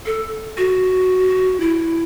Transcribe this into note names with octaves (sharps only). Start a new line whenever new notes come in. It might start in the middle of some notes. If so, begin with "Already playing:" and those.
A4
F#4
E4